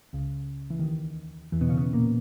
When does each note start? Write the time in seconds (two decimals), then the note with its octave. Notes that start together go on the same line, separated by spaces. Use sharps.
0.13 C#2 C#3
0.70 E3
0.79 D#2 D#3
1.52 E2 E3
1.61 B2 B3
1.69 C#3 C#4
1.77 B2 B3
1.93 A#2 A#3